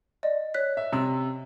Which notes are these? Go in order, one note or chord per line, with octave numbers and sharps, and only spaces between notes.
D5 D#5
C#5 F#6 B6
E5
C3 E6